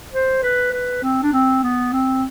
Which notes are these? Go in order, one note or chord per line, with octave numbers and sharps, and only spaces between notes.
C5
B4
B4
C4
D4
C4
B3
C4